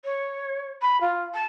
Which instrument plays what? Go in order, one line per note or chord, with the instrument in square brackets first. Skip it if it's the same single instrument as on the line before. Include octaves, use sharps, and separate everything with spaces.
[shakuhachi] C#5
B5
F4
A5